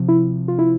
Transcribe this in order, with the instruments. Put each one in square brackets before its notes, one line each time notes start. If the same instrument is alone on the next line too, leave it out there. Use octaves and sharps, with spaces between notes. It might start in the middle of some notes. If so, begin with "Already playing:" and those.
Already playing: [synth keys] C3 F3
E4
F4
E4